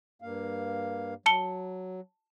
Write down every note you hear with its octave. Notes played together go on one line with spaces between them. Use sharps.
G2 A#3 F5
F#3 A5 C#7 G7